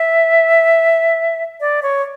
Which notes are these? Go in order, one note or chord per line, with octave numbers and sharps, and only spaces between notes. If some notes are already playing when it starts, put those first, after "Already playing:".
Already playing: E5
D5
C#5